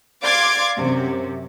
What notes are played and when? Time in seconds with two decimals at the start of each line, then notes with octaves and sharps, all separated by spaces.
0.24 D5 F5 C6 D6 G#6
0.77 F#2 C3